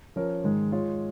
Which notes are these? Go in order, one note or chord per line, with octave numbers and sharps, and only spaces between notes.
F3 C#4 A#4 C#5
G#2 D#3 G#3
G#3 F4 C#5